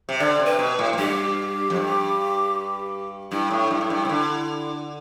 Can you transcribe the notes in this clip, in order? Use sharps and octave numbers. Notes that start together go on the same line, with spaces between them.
C3
D3 D5
C3
B4
B2
A2
A2
G2 G4
F2
G2
G2 E4
A2
G2
A2
G2
C3
D3